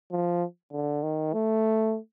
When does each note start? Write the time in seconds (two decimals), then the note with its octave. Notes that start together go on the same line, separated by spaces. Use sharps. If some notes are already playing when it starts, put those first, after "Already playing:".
0.12 F3
0.73 D3
1.03 D#3
1.34 A3